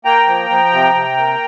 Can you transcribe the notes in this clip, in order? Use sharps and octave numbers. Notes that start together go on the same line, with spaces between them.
A#3 G5 A#5
F3
F3
C3
C3
A#3